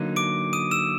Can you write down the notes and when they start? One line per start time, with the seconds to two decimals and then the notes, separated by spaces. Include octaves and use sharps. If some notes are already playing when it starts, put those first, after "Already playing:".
Already playing: D3 F#3 A#3 D#4
0.16 D6 D7
0.53 D#6 D#7
0.71 E6 E7